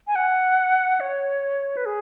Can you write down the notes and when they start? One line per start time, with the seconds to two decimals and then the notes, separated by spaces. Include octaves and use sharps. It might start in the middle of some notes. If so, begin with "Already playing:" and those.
0.07 G#5
0.16 F#5
1.00 C#5
1.77 B4
1.86 G#4